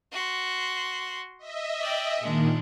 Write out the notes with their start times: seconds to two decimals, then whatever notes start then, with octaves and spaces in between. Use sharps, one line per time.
0.12 F#4 C6
1.38 D#5 E5
1.81 D5 G5
2.20 A#2 D#3 G#3 D4